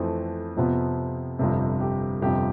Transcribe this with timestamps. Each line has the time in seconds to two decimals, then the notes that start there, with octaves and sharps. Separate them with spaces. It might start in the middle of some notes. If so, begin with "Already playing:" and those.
Already playing: F2 E3 A3 C4
0.57 F2 C3 F3 B3
1.39 G1 F2 C3
1.80 G4
2.22 G1 F2 C3 G4